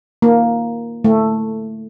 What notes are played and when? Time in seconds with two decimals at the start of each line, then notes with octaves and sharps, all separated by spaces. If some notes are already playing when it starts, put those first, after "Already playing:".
0.22 A#3
1.04 A3